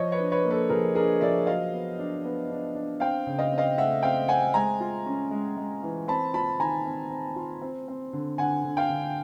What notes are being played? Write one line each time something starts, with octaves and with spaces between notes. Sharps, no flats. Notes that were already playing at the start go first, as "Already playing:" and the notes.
Already playing: F3 C#5 D#5
B4 C#5
D4
B4 C#5
A#3
A4 B4
F3 G#4 A#4
D4 G#4 A#4
F3 D5 E5
F#3 D#5 F5
B3
D4
B3
D4
D4
C4 F5 G5
C#3
D#5 F5
C4
D#5 F5
A3 E5 F#5
C4 F5 G5
C4 F#5 G#5
G#3 G#5 A#5
F4
C#4
G#3
G#3
E3
C4 A5 B5
F4 A5 B5
D#3 G#5 A#5
C4
C4
F4
C4
C4
D3
D3 F#5 G#5
D3
F5 G5
D3